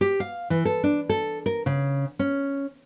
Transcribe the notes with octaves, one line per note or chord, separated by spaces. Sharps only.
G4
F5
E3
A4
D4
A4
A#4
C#3
C#4